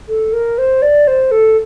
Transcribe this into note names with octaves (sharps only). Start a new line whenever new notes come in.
A4
A#4
C5
D5
C5
A4